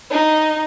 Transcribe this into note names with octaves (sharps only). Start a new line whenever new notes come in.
D#4